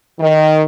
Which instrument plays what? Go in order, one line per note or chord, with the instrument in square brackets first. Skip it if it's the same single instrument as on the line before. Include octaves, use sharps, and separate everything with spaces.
[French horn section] D#3